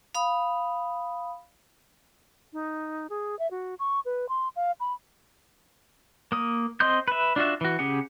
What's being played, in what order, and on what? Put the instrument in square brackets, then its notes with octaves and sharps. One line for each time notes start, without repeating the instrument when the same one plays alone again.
[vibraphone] F5 B5 D#6
[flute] D#4
G#4
E5
F#4
C#6
B4
C6
F5
B5
[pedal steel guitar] A#3 D#6
C4 D#5 C6 D#6 G6
B4 E5
D4 F4 F#4 E5
E3 F#4
C#3 C#4 G4 G#4 F#5